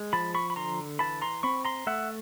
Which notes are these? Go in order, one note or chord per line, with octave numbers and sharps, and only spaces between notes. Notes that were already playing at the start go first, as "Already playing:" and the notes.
Already playing: G#3
F3 A5 B5
B5 C#6
B5
D3 A#5 C6
E3 A5 B5
A#5 C6
C4 B5 C#6
A#5 C6
A3 E5 F#5